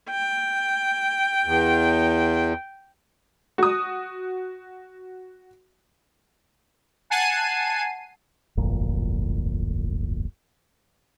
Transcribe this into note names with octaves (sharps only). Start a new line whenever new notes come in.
G5
E2
F#4 D#6
F#5 G#5 A5 C7 D#7
D1 G1 F2 A#2